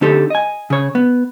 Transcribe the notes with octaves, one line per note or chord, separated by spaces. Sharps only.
D3 C4 D#4 G4 A4
D#5 G#5
C#3 C#5
B3